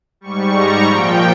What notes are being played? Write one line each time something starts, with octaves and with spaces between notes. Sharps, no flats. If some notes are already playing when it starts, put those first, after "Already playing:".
G#2 G3 C#6
A#5
A#2 F3 G5